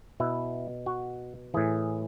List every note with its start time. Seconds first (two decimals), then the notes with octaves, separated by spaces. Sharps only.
0.20 B2 E4
0.86 F#4
1.54 A2 E3 G#4